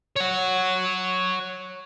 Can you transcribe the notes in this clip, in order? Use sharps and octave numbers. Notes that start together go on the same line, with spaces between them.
C#5 F#5